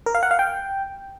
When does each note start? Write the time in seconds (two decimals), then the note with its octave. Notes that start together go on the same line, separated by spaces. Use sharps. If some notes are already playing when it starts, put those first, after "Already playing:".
0.06 A#4
0.15 F5
0.23 F#5
0.31 F5
0.39 G5